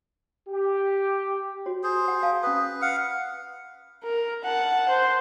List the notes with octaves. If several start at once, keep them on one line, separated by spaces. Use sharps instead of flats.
G4
F#4 C#5
G#4 C5
F#5
F5 G#5 A5
C#4 B4 D#6
F5 F#5
A#4
F#5 A5
C5